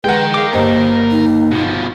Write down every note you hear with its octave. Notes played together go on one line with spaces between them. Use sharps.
G#3 A#4 B4 F#5 G5
G#4 F5 D6
G1 A#3 G4 C5 D#5
D#4
B2 F3